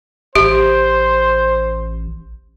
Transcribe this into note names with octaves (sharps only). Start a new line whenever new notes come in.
A1 G4 C5